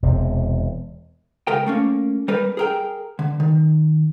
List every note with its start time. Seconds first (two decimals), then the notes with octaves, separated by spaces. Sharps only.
0.03 E1 C3
1.47 C#2 A#4 G5
1.67 A3 A#3 C#4
2.28 G3 A#4 B4
2.57 G#4 A#4 G5
3.19 D3
3.40 D#3